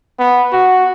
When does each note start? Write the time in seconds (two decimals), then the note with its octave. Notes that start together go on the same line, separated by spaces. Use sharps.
0.20 B3
0.53 F#4